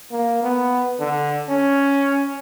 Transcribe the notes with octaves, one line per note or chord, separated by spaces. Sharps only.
A#3
B3
D3
C#4